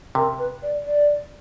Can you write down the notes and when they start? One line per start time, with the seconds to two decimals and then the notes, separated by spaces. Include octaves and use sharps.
0.15 C3 A#4
0.39 B4
0.62 D5
0.85 D5